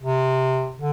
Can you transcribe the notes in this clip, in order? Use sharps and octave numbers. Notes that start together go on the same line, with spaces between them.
C3
D3